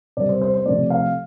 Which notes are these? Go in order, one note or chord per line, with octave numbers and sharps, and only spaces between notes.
C3 G3 D5
C5
C5
C5
C3 F3 A3 D5
F5